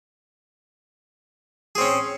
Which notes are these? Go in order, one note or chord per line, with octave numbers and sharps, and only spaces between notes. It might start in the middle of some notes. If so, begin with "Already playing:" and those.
C4 C#4 G#4